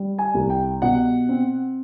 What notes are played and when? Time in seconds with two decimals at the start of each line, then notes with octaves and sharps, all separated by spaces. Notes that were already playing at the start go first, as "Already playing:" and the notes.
Already playing: G3
0.19 G#5
0.34 C2
0.50 G5
0.82 B2 F#5
1.29 C4